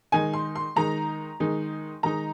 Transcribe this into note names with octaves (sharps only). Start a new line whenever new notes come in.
D#3 G#3 D#4 G#5
C6
C6
D#3 G#3 D#4 A#5
D#3 G#3 D#4
D#3 G#3 D#4 A#5